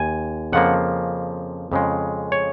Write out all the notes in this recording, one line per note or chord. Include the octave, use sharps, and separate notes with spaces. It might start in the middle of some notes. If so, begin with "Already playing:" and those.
Already playing: D#2 G#5
F2 C#3 F3 A#3 F#5
F2 C#3 G#3
C#5